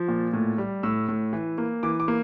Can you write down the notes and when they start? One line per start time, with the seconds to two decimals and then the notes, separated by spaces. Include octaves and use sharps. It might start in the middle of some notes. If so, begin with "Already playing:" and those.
Already playing: F3
0.08 A#2
0.33 A2
0.58 G3
0.83 A2 E6
1.08 A2
1.33 E3
1.58 A#3
1.83 E3 D6
2.00 D6
2.08 A#3